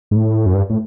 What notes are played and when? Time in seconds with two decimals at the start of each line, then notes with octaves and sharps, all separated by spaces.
0.11 G#2
0.16 A2
0.46 F#2
0.54 G2
0.70 A2